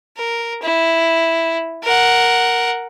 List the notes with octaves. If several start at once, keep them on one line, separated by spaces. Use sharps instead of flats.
A#4
E4
A#4 F#5